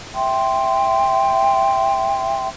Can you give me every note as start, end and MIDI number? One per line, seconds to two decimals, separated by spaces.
0.14 2.48 76
0.14 2.48 79
0.14 2.48 84